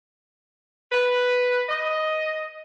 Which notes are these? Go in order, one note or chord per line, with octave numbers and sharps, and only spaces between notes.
B4
D#5